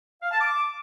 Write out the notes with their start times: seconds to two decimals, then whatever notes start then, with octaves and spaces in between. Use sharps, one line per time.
0.22 F5
0.32 A5
0.41 D6